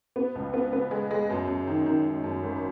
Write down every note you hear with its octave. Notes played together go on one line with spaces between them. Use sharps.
B3
C#2
B3
B3
G#3
G#3
F#2
F#2
D#3
D#3
D#3
F#2
G#1